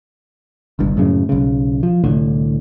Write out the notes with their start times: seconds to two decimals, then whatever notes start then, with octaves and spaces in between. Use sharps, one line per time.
0.79 G1 C2 G2
0.97 F#2 A2 C#3
1.29 B1 C#3
1.83 F3
2.04 C2 A2 D3